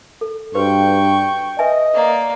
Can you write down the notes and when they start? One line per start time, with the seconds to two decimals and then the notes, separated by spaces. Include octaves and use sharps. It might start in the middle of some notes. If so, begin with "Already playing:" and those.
0.21 A4
0.55 G2 F#4 B4 C5 G5 C#6
1.59 B4 D#5 E5 G#5
1.94 A#3 D5